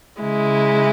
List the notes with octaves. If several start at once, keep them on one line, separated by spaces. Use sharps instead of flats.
C#3 G#3 E4